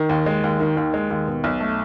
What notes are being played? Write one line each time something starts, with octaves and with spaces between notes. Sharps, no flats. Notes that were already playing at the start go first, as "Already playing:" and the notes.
Already playing: D#3
D#2
G#3
D#2
D#3
D#2
G#3
D#2
B2
B1
A3